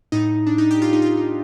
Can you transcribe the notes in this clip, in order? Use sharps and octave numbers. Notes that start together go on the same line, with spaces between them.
A2 D#4
D4
D#4
G4
F4
D#4
F4
D#4